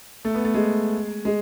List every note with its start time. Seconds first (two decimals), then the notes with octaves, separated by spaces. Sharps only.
0.25 A3
0.35 B3
0.45 A3
0.54 G#3
1.25 G#3